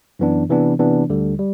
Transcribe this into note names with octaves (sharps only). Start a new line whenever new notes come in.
F#2 E3 B3 D4
C3 E3 B3 D4
C3 E3 B3 D4
D2 D3 G3
G3